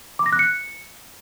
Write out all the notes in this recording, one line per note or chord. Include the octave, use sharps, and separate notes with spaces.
D6
A#6
F#6
C#7